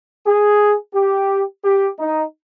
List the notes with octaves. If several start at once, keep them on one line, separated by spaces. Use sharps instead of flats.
G#4
G4
G4
D#4